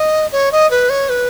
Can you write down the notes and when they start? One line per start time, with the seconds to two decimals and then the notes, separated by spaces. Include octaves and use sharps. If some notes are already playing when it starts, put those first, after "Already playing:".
Already playing: D#5
0.32 C#5
0.52 D#5
0.71 B4
0.90 C#5
1.09 B4